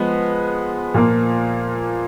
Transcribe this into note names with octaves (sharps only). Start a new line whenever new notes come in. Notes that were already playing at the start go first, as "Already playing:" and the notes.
Already playing: F3 G#3 B3
A#2 F3 A#3